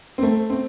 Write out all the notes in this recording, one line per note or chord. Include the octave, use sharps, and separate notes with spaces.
C4
A3
C4